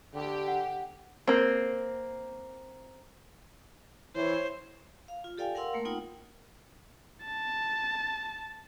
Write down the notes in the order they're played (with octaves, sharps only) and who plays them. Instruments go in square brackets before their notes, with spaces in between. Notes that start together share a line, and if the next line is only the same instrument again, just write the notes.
[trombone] D3 [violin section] G4
[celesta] F#5
[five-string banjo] A#3 C4
[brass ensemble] E3 [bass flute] E4 [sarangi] C5 [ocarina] C#5
[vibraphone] F5
F4
G4 A4 D5 F5 G5 G#5
A#4 F5 F#5 C6 E6
A3 A#3 A#4
B3 D#4 F4 F#5 G5 D#6
[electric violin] A5